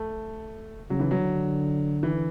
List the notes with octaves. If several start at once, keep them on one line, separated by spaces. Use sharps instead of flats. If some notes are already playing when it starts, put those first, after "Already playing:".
Already playing: A3
C#3 F#3
E3
F#3
D3
E3